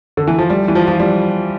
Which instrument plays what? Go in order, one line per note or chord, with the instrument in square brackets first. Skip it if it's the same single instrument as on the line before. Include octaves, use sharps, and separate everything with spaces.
[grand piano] D3
E3
F3
G3
E3
F3
F3
G3